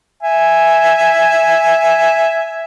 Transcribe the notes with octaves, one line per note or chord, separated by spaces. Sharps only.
E5 G#5